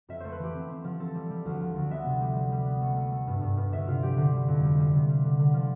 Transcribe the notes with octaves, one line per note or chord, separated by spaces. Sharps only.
F2 E5
A3 C5
B4
E3 G4
C4
C4
F3
C4 A4
G3
G3
D2
F3
D2
B3 E5
C3
G3
G3
G3
B3
A3
A3
A3
G2
G2
G2
D2 E5
C3 F4
F3 G4
D3 C5
G3
F2
G3
G3
C3
G3
D3
D3
F3